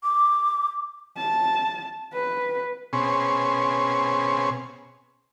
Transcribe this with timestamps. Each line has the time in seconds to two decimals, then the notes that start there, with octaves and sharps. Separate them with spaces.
0.03 D6
1.17 A5
2.13 B4
2.93 B2 C4 C#4 G#4